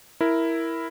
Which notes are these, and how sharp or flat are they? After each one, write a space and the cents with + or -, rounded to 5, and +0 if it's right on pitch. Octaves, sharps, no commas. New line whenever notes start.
E4 +0 A#4 +0